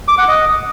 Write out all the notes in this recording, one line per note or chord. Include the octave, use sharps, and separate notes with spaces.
D6
F#5
D#5